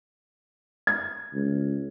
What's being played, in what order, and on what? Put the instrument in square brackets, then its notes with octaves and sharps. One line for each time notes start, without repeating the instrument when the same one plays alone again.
[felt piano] G#6
[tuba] C#2